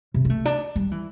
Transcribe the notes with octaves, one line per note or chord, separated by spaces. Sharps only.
C3
C4
A3
D4
G3
E3